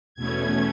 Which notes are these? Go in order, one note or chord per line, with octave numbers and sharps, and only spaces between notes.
E2 B2 A3 C#4 G#6